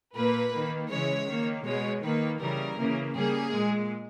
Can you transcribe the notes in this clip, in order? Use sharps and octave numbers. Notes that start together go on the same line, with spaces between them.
A#2 A#3 B4
D#3 A#3
C#3 E3 G#3 C#5
D#3 A#3
B2 G#3 C#5
D#3 A#3 B4
C#3 E3 G3 A#4
C#3 E3 A#3
C#3 G3 A#3 G#4
A#2 G#3